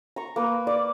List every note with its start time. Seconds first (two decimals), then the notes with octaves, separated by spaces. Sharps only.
0.16 A#5 C#6
0.36 A#3 B4
0.67 D5